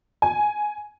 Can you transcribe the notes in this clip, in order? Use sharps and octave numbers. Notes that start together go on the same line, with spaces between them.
G#5